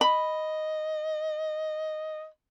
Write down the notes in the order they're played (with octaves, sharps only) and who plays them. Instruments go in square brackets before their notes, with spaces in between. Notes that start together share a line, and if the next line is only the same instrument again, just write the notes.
[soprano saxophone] D#5 [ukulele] B5